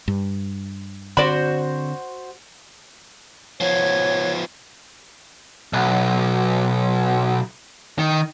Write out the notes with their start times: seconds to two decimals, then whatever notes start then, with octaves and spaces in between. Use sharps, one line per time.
0.08 G2
1.17 D3 C4 F#4 C5 D5 B5
3.61 F3 B3 C#5
5.73 B1
7.99 D#3